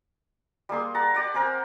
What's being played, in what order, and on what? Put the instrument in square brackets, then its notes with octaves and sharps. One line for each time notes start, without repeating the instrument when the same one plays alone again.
[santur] G3 A#3 G#4 C6
F#5 A5 A#5
G4 D5 F#5
C4 A#4 C5 G#5